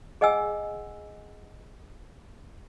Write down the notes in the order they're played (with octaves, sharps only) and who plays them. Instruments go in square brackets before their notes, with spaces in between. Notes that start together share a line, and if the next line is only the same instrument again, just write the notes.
[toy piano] G#4 D#5 F#5 G#5 E6